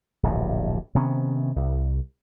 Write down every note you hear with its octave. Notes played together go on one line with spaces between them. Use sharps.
D1 A#1 G2
C3 D#3 B3 C#4
C2